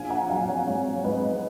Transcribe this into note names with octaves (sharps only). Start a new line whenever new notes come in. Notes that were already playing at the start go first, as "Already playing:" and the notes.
Already playing: A#1 F5 G#5
F#5 A#5
F#3 F5 G#5
F#5
C#5 F5
G#2 C#5 F5
G#2 B4 D#5